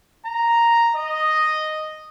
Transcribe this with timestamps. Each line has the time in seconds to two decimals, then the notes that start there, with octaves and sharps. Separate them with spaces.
0.25 A#5
0.95 D#5